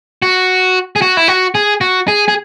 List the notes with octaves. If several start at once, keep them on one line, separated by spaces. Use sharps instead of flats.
F#4
G#4
F#4
E4
F#4
G#4
F#4
G#4
G#4